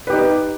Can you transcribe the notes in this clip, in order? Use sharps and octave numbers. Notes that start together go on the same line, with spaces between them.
D#4 G4 B4